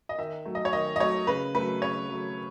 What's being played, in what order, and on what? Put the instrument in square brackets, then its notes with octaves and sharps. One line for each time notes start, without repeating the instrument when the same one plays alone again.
[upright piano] D#5
D#3 E5
F#3 A3
D#5
C#5
D#3 D#5
D#5
F#3 A3 C#5
C#3 B4
F#3 A3 B4
C#3 C#5
F#3 A3